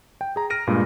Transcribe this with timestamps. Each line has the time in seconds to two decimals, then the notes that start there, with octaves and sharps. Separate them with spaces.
0.21 G5
0.36 G#4 A#5
0.50 F6 A#6 D7 D#7
0.67 G2 A#2 G#3